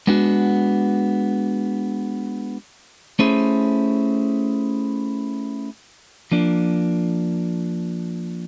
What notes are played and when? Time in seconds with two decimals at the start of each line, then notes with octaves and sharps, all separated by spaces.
0.07 G#3 B3 D4 F#4
3.19 A3 C#4 E4 G#4 C5
6.32 F3 A#3 D4